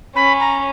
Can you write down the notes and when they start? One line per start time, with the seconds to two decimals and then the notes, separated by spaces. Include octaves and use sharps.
0.16 C#4 B5
0.40 A#5